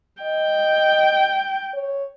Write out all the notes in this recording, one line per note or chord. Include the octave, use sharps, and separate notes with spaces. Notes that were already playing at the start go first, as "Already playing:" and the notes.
D#5 G5
C#5